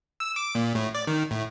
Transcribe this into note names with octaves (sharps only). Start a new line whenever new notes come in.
E6
D6
A#2
A2
D5
D#3
A2